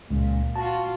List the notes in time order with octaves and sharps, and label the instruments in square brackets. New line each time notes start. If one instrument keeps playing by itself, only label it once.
[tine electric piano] C#2 [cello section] A#2
[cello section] F4 F#4 [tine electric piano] A5